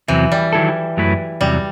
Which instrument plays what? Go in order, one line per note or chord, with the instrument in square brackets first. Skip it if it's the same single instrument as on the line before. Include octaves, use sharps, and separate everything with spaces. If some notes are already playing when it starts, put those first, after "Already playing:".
[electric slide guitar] E2 C3 F#3 C4 [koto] E3
[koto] G3
[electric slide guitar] D#3 F#3 C4 E4 A4
F#2 F#3 A3 E4 B4
[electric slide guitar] E2 C3 F#3 [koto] G3